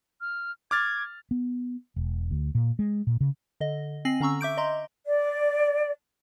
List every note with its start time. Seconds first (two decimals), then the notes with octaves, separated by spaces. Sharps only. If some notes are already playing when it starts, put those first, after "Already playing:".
0.21 F6
0.71 D6 F6 G#6 A6
1.31 B3
1.96 E1
2.31 D2
2.55 A#2
2.79 G#3
3.07 A#2
3.21 C#3
3.61 D3 D#5
4.05 C4 G#5 A#6 C7 F#7
4.20 D3 C#4 A#5 C#6 E6
4.41 E5 D6 G6 D7
4.57 D#5 A#5 C6
5.06 D5